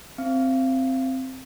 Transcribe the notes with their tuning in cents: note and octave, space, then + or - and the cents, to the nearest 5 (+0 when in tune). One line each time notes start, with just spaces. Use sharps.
C4 +0 F5 -30